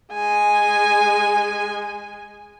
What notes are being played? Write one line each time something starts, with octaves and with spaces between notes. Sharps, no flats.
G#3 G#5